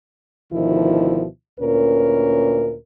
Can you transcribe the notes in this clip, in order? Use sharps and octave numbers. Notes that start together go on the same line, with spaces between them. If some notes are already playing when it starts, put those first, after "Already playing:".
D2 B2 D#3 F3 E4
D2 A#2 C#4 A#4 B4